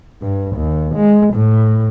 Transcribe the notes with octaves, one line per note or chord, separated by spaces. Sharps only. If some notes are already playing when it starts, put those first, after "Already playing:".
G2
D#2
G#3
A2